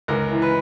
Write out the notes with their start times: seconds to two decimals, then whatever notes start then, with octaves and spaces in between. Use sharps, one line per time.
0.08 C#2 A#4
0.31 E3
0.42 B4